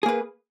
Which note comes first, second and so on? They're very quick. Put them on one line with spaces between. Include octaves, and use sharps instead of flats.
G#4 A#3 B4